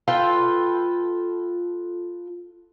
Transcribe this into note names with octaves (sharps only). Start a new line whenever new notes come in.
F4 A4 B4 G5